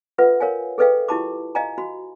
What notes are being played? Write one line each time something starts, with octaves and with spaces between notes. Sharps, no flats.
F4 A4 B4 E5 F#5
A#4 C#5 F5 G#5
G#4 A4 B4 D#5 F5 G5
E4 F4 G4 A5 B5 D6
D#5 F5 G#5 A#5
F#4 B5